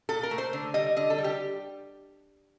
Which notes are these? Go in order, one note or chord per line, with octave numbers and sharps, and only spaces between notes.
A#2 A4
A#4
A3
C5
D3
G3 D#5
D3 D#5
A4
G3
G4